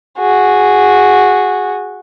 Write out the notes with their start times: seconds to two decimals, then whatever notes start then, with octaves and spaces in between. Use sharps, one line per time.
0.19 F#4 G#4